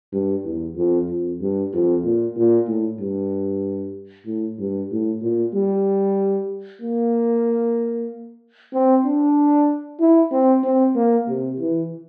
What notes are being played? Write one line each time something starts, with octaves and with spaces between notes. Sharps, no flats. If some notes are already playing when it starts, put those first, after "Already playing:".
G2
E2
F2
F2
G2
F2
A#2
A#2
A2
G2
A2
G2
A2
A#2
G3
A#3
C4
D4
E4
C4
C4
A#3
C3
E3